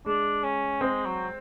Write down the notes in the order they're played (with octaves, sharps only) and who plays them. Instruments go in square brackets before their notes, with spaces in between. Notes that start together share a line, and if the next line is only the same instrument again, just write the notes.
[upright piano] G#3 [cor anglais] D4
[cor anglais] C#4
[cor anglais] G#3 [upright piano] C4
[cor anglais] F#3